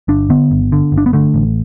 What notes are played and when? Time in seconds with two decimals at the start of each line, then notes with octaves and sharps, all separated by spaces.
0.08 G1 D4
0.30 D3 B3
0.51 G1
0.72 D3
0.92 G1
0.98 D4
1.06 B3
1.13 D3 A3
1.34 A1